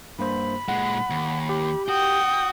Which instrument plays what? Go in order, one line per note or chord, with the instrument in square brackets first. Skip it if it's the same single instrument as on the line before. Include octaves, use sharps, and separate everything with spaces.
[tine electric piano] G2 A#3 C5 [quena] B5
[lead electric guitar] A#2 G#3 [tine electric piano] F#5
[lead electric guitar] D#2
[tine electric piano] G4
[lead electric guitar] F#4 [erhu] G5 [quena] D#6